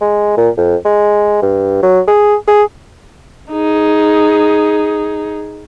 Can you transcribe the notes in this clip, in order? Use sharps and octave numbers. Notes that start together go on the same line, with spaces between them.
G#3
A#2
F2
G#3
G2
F#3
G#4
G#4
D#4 G#4